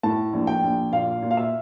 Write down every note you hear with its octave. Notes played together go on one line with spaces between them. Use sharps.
A2 A5
A#1
G5
A#1
A#2 F5
A#2
F5
E5